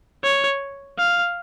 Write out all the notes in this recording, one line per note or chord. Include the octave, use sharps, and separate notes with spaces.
C#5
F5